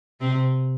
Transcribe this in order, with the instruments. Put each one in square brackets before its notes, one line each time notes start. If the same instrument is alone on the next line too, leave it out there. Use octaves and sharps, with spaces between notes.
[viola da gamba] C3 C4